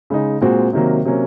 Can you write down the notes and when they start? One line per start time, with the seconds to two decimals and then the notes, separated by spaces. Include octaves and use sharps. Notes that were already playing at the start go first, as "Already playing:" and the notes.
0.10 C#3 G#3 D#4
0.41 A#2 G#3 C4 F#4
0.73 C3 D#3 F#3 A#3
1.05 C3 F#3 A#3 C#4